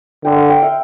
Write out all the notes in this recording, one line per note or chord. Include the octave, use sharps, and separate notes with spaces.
D3 G5
F5
G5
E5